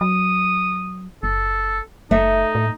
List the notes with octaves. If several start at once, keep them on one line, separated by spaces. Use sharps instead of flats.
F#3 D#6
F#1 A4
F#1 A3 D#4 E5
A2